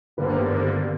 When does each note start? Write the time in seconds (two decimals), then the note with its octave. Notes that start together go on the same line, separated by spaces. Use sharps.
0.17 G2 D3 G3 A#3 B4
0.25 C5
0.33 B3 B4
0.53 C4 C5